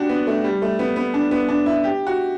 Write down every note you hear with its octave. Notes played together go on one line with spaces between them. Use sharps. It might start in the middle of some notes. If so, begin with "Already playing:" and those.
Already playing: D4 F#4 G4
B3
A3
G3
A3
B3
B3
D4
B3
D4
E4
G4
F#4